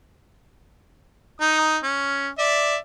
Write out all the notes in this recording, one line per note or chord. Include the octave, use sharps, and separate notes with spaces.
D#4 D#6
C#4
D5 E5